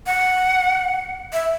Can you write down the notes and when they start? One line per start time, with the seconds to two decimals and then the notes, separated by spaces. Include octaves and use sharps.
0.06 F#5
1.33 E5